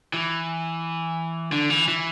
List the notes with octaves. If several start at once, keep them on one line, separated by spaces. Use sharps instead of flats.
E3
D3
E3
E3